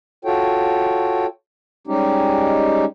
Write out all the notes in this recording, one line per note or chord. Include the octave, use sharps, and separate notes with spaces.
F4 F#4 A4 C#5 G5
G3 G#3 C#4 D#4 G4